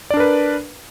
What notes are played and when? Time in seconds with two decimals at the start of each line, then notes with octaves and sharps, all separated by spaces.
0.10 D5
0.14 D4
0.17 A#4
0.20 B4